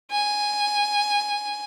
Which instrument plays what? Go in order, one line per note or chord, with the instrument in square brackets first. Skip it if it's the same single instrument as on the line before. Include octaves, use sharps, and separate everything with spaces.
[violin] G#5